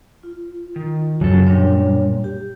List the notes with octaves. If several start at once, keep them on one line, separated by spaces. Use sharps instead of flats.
F4
D#3
F#2 C#3 F#3 A4
A#2 G3 D4 C#5
G4